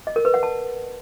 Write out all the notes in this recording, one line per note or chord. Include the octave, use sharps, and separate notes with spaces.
D#5
A#4
B4
F#5
A5